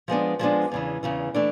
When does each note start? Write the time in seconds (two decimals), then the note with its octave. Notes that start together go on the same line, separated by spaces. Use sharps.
0.08 F3 G#3 B3 D4
0.39 F3 G#3 B3 D4
0.72 E2 C#3 E3
1.03 E2 C#3 E3
1.34 E3 A3 D4